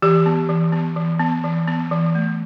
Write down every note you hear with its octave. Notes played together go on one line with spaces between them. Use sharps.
E3 G4
B3
E3
B3
E3
B3
E3
B3
E3
A3